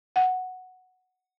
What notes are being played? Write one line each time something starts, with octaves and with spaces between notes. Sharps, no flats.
F#5